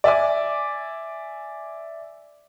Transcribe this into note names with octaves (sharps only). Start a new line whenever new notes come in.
D5 E5 G#5 D6